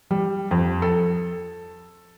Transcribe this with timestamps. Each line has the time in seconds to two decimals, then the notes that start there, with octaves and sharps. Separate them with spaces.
0.11 G3
0.51 F2
0.82 A4